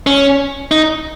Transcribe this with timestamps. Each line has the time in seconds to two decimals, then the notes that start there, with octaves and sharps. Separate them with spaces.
0.07 C#4
0.71 D#4